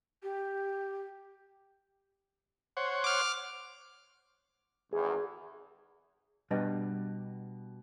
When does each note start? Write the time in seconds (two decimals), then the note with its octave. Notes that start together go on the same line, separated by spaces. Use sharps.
0.23 G4
2.77 C5 C#5 F#5
3.04 D6 F6
4.93 G#1 E2 G#4
6.51 B2 G3 D4 B4 D#5 G5